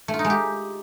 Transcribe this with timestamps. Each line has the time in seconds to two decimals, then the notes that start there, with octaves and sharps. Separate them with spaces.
0.08 A3
0.14 F4
0.19 D#4
0.24 G#3
0.30 G4